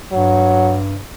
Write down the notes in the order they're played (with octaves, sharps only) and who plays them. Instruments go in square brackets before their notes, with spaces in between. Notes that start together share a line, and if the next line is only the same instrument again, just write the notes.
[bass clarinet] G2 [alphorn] F#3